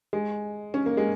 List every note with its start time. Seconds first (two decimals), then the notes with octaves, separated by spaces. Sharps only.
0.13 G#3
0.74 C#4
0.86 A#3
0.97 G#3